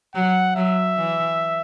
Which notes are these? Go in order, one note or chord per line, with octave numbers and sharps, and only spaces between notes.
F#3 F#5
F#3 E5
E3